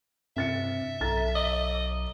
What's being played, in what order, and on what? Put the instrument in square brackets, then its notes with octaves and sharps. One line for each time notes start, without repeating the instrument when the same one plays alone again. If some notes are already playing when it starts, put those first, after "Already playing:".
[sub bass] G2 [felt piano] C3 A6 C#7 [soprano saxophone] E5
[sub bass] B1 [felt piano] A4 A#5 A6
[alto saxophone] D#5